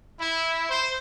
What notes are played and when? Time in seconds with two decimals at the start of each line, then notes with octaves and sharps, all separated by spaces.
0.20 E4
0.70 C5